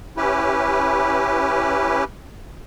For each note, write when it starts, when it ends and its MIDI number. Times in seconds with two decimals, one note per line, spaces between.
0.17 2.04 61
0.17 2.04 64
0.17 2.04 67
0.17 2.04 71